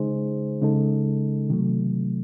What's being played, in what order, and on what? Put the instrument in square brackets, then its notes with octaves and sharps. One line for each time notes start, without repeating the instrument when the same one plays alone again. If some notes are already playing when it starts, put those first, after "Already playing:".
Already playing: [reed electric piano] C#3 G#3 D#4 G#4 C5
C#3 G#3 D#4 A4
C3 D#3 F#3 A3